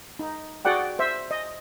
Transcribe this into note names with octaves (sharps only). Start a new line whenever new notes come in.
D#4
F#4 G#4 D5 F#5 G5
C5 E5
D#5